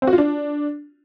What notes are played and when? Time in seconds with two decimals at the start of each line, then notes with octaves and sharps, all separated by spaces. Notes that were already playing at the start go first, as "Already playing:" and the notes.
0.02 C4
0.07 F#4
0.13 F4
0.18 D4